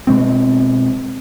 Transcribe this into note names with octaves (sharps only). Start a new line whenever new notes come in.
B2 G#3 C4